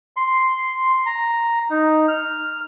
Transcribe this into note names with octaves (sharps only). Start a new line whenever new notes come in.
C6
A#5
D#4
F6